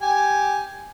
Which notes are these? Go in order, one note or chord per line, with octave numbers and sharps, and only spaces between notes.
G4 G#5